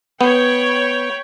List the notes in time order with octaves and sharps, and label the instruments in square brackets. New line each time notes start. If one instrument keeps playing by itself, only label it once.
[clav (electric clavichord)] B3 [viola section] C#5 G5 B5